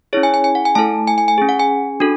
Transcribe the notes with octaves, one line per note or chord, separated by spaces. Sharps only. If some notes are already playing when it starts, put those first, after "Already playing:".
C#4 E4 G#4 C#5
G#5
G#5
G#5
F#5
G#5
A3 E4 A4 A5
G#5
G#5
G#5
C#4 G#4
F#5
G#5
D4 F#4 A4